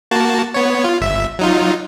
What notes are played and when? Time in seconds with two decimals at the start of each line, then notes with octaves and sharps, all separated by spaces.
0.11 A#3 F#4 A5
0.54 B3 C#5
0.84 F4
1.01 G1 E5
1.39 F#3 D#4 F4